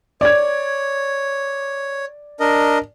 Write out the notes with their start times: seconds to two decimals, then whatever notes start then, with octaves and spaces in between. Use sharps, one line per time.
0.21 C#5 D5 G#6
2.40 D4 A#4 D#5